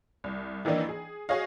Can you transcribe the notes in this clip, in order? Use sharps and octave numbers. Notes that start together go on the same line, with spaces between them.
C2
D#3 E3 A#3 D4 D#4
G#4
F#4 G#4 C#5 D#5 F5